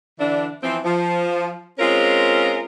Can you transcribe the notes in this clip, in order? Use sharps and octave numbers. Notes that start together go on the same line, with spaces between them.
D3 E3 D4
E3 F3 C4
F3
G#3 C4 C#4 F4 A#4